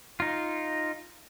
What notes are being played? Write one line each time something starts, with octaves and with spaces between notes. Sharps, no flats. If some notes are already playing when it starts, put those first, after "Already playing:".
D#4 F4